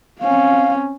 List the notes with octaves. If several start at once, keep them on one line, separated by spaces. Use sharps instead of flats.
C4 C#4 F5